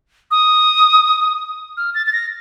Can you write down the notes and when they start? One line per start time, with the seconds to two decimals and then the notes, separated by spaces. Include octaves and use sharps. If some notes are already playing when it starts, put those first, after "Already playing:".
0.31 D#6
1.77 F6
1.95 A6
2.06 A6
2.13 A#6